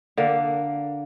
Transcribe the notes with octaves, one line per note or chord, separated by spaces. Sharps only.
D3 A#3